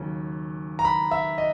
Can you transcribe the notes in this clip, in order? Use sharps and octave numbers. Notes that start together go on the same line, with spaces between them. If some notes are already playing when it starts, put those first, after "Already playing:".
Already playing: D#2 C#3 F#3 C#4
A#5
B5
E5
D#5